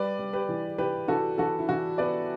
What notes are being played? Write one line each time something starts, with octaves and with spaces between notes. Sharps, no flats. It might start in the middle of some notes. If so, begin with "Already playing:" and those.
Already playing: G3 B4 D5
G3
G4 B4
E3
E3 G4 B4
E3 F#4 A4
E3 F#4 A4
E4
E3 F#4
B3 B4 D5